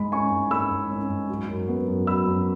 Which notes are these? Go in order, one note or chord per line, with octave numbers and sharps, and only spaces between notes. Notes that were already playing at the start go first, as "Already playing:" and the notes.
Already playing: G#2 G#3 B5
C#4 G#5 C#6
G#2
G#3 B5 E6
G#2
C#4
G#2
F#3
F#2
B3
F#2
F#3 B5 E6
F#2